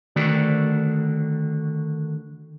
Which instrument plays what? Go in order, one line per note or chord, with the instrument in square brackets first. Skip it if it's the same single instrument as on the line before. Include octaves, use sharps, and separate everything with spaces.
[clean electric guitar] D3 D#3 A3 F#4 D5